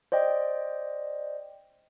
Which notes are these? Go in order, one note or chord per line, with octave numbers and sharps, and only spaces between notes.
C5 D5 D#5 G5